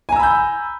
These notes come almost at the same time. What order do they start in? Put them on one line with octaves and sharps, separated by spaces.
G#5 A#5 E6 B5 G6